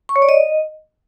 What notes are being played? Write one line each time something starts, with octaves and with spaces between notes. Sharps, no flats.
C#6
C#5
D5
D#5